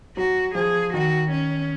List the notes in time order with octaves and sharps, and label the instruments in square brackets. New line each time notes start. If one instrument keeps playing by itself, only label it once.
[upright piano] F#3 [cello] F#4
[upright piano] F3 [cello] G#4
[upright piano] D#3 [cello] F#4
[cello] C#4